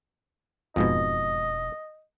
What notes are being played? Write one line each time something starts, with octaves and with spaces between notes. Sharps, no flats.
E1 F2 G#2 B2 D#5